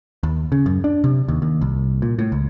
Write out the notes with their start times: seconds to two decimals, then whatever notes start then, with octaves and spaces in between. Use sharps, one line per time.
0.23 D#2
0.52 C#3
0.66 F#2
0.84 D4
1.04 C3
1.28 D#2
1.42 D#2
1.61 C2
2.02 A#2
2.19 A2
2.32 C#2